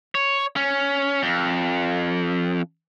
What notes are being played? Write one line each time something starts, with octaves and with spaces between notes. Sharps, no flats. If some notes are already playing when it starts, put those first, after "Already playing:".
C#5
C#4
F2